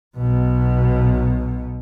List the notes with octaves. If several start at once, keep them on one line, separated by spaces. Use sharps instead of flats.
B1 B2